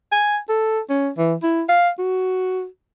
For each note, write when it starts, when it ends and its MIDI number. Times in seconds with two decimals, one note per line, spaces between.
0.12 0.38 80
0.49 0.80 69
0.89 1.10 61
1.18 1.34 52
1.43 1.63 64
1.69 1.89 77
1.99 2.66 66